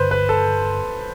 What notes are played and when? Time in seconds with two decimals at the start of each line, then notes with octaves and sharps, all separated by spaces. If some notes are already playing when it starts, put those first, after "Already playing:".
Already playing: G2 D3 B4 C5
0.11 B4
0.29 A4